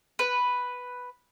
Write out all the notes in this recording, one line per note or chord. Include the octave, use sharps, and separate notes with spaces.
B4